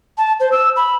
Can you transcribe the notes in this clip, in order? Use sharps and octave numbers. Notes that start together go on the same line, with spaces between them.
A5
C5
E6
B5